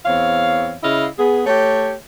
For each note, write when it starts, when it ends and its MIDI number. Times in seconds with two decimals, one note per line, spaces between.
0.05 0.73 40
0.05 0.73 60
0.05 0.73 73
0.05 0.73 77
0.83 1.05 49
0.83 1.05 64
0.83 1.05 75
0.83 1.05 77
1.18 1.43 59
1.18 1.43 68
1.46 1.93 57
1.46 1.93 67
1.46 1.93 73